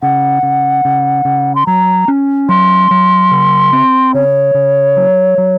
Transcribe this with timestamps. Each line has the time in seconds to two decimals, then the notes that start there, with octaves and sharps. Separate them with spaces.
0.02 C#3 F#5
0.43 C#3
0.85 C#3
1.25 C#3
1.55 C6
1.66 F#3 A#5
2.08 C#4
2.49 F#3 C6
2.91 F#3
3.31 C#3
3.73 C4
4.14 C#3 C#5
4.54 C#3
4.96 F#3
5.38 F#3